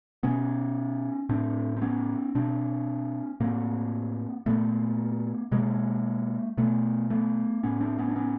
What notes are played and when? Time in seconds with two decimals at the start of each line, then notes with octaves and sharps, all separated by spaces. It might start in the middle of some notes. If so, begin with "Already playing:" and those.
0.23 B2 B3 C#4
1.29 A2 C4 D4
1.77 C4
1.82 B3 C#4
2.35 B2 C4 D4
3.40 A2 A#3 C4
4.46 A#2 A3 B3
5.52 B2 G#3 A#3
6.58 B2 A3 B3
7.10 A3 B3
7.63 A2 B3 C#4
7.81 C4 D4
7.98 B3 C#4
8.09 D4
8.16 B3 C#4